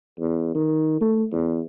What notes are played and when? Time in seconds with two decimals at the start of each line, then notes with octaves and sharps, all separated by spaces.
0.20 E2
0.55 D#3
1.01 A3
1.32 E2